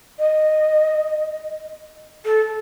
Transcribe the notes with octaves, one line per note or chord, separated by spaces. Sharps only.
D#5
A4